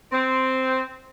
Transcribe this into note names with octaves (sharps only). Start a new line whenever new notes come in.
C4